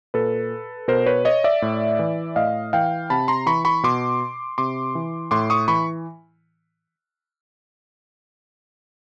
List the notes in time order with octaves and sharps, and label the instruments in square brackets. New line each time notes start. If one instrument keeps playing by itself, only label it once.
[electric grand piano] A#2 A4 B4
B2 A#4 C5
B4 C#5
C#5 D#5
D5 E5
A2
E3
A2 D#5 F5
E3 F5 G5
C3 A5 B5
A#5 C6
E3 B5 C#6
B5 C#6
B2 C6 D6
C3 C6 D6
E3
A2 C6 D6
C#6 D#6
E3 B5 C#6